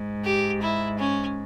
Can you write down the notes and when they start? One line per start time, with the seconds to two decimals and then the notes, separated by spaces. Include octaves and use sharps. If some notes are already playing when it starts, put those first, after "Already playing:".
Already playing: G#2
0.24 G4
0.62 E4
0.98 C#4